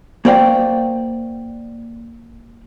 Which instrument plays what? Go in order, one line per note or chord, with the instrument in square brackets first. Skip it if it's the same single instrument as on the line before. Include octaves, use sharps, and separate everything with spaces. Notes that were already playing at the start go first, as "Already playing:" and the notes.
[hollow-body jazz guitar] A#3 F#4 C5 D5 F5 G5